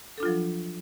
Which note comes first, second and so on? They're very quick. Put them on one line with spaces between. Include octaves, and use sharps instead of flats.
A4 D4 F4 F#3 F3